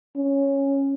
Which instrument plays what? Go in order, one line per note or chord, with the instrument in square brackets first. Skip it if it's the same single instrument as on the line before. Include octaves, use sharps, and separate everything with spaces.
[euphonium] C#4